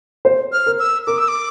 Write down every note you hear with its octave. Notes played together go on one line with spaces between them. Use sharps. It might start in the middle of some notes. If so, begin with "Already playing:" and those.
C5
F6
A#4
E6
A#4 D6
E6
D6